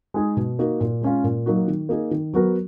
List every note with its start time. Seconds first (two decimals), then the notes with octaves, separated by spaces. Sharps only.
0.14 G#3 D#4 G#4
0.37 B2
0.59 A#3 D#4 F#4 A#4
0.81 A#2
1.02 G#3 C#4 F4
1.24 A#2
1.46 F#3 A#3 D#4 F#4
1.68 D#3
1.89 A#3 D#4 G#4
2.11 D#3
2.34 F#3 B3 F#4 A#4